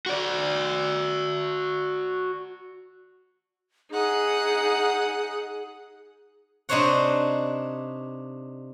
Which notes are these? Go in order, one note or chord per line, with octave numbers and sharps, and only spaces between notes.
F#4 D5
D#4 G#4 F#5 D#6
C3 D4 D#4 C5 C#5 F#5